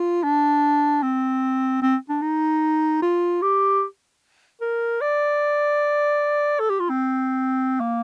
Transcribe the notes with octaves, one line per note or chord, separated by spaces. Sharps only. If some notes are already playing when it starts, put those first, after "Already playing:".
Already playing: F4
D4
C4
C4
D4
D#4
F4
G4
A#4
D5
A4
G4
F4
C4
A#3